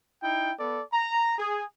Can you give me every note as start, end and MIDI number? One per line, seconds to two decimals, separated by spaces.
0.23 0.51 63
0.23 0.51 64
0.23 0.51 79
0.59 0.82 59
0.59 0.82 69
0.59 0.82 74
0.93 1.36 82
1.38 1.63 68